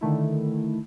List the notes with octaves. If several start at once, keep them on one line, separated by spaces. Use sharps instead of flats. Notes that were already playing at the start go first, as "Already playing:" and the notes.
D3 D#3 A3 E4